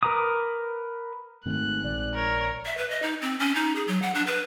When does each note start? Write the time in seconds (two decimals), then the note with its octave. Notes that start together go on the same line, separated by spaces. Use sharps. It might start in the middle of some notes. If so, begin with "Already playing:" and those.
0.03 A#4 B4 A#5 D6 D#6
1.46 G#1 G#2 D#3 A3 F#6
1.84 A#1 D5
2.15 A#4 C#5
2.66 E5
2.78 B4
2.90 D#5
3.02 D#4
3.22 C4
3.40 C#4
3.55 D#4
3.76 G#4
3.88 F#3
4.02 F#5
4.15 D4
4.27 B4